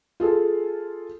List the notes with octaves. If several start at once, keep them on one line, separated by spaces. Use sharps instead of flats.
F4 G#4 A4